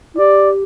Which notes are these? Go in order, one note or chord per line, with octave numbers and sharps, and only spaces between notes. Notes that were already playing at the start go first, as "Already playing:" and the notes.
E4
G4 D5